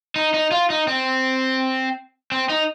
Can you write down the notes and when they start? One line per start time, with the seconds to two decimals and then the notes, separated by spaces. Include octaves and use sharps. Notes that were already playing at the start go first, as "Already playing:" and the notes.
0.16 D#4
0.34 D#4
0.51 F4
0.70 D#4
0.88 C4
2.32 C4
2.49 D#4